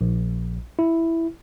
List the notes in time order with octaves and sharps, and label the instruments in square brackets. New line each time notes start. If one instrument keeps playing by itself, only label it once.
[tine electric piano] A#1
E4